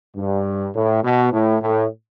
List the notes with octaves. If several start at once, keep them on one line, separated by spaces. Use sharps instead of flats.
G2
A2
B2
A2
A2